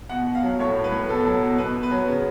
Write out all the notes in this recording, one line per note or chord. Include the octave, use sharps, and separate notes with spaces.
B2 F#5
B2
F5
F#3
A2 C#5
A2
B4
A2
B2 A4
F#3
B2
B2 B4
B2
B4
F#3
C#3